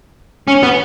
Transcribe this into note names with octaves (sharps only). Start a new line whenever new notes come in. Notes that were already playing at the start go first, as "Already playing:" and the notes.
C#4
B3